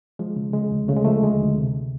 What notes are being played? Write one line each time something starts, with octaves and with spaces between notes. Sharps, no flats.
F3 G#3
C#3
C#3 G#3
D2
C#3 A3
G#3
F3 A3
D2 G#3
D2
C3